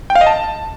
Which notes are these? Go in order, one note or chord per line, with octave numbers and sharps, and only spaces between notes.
G5
F5
D#5
A5